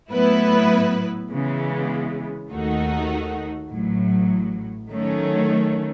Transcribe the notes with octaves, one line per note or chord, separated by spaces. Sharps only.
A2 F#3 B3 E4 B4
C#3 E3 G#3 B3
D#2 D#3 A3 D#4 F#4
A1 A2 F#3
D#3 F#3 A3 C#4